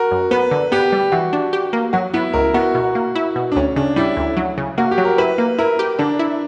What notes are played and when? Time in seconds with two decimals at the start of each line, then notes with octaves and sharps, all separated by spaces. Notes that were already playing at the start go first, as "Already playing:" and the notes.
Already playing: F#4 A#4
0.11 F#2
0.31 B3 B4
0.51 D3
0.72 B3 G4
0.92 G3
1.12 E3 F#4
1.33 D4
1.53 G4
1.73 A#3
1.93 F#3 F#4
2.14 B3 E4
2.33 C#2 A#4
2.54 B3 F#4
2.75 B2
2.95 A#3
3.15 E4
3.36 B2
3.52 D4
3.56 D2 C#4
3.76 C#3 D4
3.96 G3 E4
4.17 D2
4.37 F#3
4.58 C#3
4.78 A#3 F#4
4.91 G4
4.98 F#3
5.05 A#4
5.18 E4 B4
5.38 A#3
5.58 E4 A#4
5.79 G4
5.99 D3 D4
6.19 E4